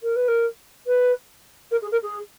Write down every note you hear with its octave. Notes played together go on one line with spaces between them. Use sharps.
A#4
B4
A#4
B4
A#4
G#4
A#4
G#4